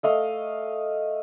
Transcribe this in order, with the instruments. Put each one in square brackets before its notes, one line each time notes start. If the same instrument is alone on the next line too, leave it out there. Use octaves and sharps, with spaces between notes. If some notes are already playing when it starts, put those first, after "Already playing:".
[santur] A3 D#5 F5